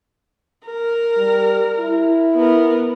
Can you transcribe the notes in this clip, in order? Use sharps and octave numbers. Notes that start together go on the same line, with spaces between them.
A#4
G3
E4
B3 A#4